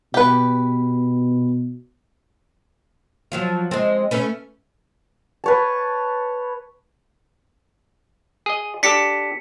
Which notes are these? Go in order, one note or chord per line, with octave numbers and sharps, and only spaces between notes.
B2 G4 B4
F3 F#3 F4
G#3 C4
A3 C#4 B4
B4 C#5 A5
G#4 D#5
D4 G4 A4 B6 C#7